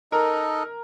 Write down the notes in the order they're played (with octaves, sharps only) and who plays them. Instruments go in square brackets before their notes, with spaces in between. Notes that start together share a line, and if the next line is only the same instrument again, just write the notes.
[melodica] D#4 A4 D#5 [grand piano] A#4